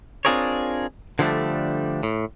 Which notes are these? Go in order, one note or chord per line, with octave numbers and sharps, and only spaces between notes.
C4 D4 F4 G#4 A#4 C#5
D3 F3 G3 A3 D4
A2